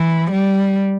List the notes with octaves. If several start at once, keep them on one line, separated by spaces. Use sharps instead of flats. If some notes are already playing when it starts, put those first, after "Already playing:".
Already playing: E3
G3